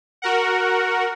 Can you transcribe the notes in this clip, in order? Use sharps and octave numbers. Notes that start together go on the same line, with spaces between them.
F#4 A#4 F#5